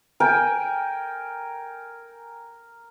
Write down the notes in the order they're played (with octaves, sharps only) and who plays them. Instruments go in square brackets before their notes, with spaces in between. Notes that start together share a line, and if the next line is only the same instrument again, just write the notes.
[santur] A#4 G5 G#5